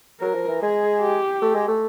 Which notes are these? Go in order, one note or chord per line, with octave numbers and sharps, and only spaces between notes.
F#3 A#4
F3
E3
G#3 G#4
G4
A3
G#3
A3